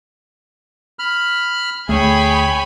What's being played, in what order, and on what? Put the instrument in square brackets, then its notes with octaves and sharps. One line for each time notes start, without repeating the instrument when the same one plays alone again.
[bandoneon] B5 F6
[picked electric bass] D2 A3 [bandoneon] G#4 [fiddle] C#5 G5 [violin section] G#5 B5